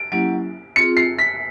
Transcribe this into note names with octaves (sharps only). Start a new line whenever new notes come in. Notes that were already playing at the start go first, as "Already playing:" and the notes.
Already playing: D7
F#3 A#3 C#4 E4 G4 D7
C4 F4 G#4 C#7
C7
B6